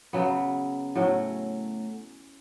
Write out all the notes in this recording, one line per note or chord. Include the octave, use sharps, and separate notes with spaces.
C#3 F#3 B3
A2 F#3 A3 C#4